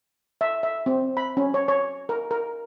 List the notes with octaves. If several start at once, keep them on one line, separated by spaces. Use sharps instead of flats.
E5
E5
C4
B5
C#4
C#5
C#5
A#4
A#4